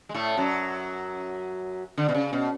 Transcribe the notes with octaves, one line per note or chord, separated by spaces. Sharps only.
G#3
A2 A3
F#2 F#3
D3
B2
C#3
B2